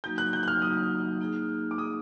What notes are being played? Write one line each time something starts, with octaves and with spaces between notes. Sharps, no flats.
F#3 A#3 D#4 F#4 G6
F#6
G6
F#6
F6
F#3 A#3 D#4 F#4 D#6
A#3 D#4 G#4
D6
A#3 D#4 G#4 D#6